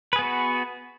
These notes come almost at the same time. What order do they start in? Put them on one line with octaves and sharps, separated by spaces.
B4 G#4 B3 F#4